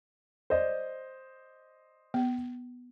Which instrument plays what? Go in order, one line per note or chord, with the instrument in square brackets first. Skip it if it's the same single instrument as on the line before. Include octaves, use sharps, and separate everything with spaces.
[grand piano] C5 D5 D#5
[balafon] B3